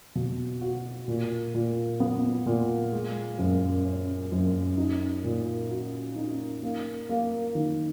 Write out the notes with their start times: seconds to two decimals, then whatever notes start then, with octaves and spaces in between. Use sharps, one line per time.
0.15 B2
0.61 F#4
1.08 A#2
1.54 A#2
2.00 B3
2.46 A#2
2.92 G#3
3.38 F#2
3.85 C#4
4.32 F#2
4.78 D#4
5.24 A#2
5.70 F#4
6.16 D#4
6.63 A#3
7.09 A#3
7.55 D#3